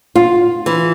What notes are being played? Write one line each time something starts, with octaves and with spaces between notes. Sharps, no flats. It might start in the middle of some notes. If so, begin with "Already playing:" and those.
F4
E3